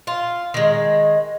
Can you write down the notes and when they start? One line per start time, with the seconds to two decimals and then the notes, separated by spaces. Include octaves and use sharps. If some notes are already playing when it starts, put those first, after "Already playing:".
0.07 F4
0.54 D#3 G#3